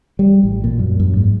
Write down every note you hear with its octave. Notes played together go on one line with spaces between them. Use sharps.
G3
A1
A#2
F#2
F#2
G#2